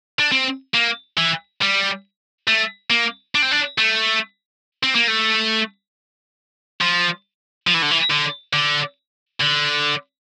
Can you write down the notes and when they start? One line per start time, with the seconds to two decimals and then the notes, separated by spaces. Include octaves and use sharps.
0.20 D4
0.32 C4
0.74 A#3
1.18 E3
1.62 G3
2.48 A3
2.90 A#3
3.35 D4
3.42 C4
3.51 D4
3.78 A3
4.83 C4
4.95 A#3
5.08 A3
6.81 F3
7.67 F3
7.74 E3
7.82 D3
7.91 E3
8.10 D3
8.53 D3
9.40 D3